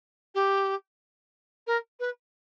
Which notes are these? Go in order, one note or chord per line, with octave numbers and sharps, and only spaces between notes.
G4
A#4
B4